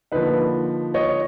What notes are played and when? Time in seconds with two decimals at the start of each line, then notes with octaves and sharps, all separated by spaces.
0.12 D3 F3 A#3 D#4 B4
0.94 C#5 D#5